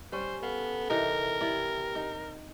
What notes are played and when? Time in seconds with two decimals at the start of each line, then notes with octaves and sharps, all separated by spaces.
0.12 G3 C#4 C5
0.43 B3 A4 F5
0.90 C3 E3 D#4 A#4
1.41 E4 G4 D5
1.95 D#4